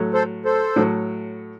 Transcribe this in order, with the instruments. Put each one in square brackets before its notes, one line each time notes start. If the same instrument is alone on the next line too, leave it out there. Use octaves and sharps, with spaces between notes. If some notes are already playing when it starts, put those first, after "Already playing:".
Already playing: [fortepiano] A2 F#3 A3
[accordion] A4 C5
A4 C5
[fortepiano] A2 F#3 A3